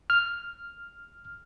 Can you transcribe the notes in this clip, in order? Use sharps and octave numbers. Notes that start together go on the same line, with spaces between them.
F6